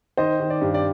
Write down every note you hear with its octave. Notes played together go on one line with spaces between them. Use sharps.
D#3 C5 D#5
D#3
D5
G2
D5